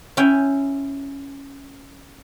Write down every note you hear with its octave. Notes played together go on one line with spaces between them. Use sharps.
C#4 E4 G5